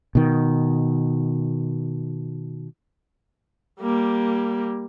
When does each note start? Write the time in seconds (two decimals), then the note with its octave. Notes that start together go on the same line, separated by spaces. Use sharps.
0.15 B2 D#3
3.80 G3 A#3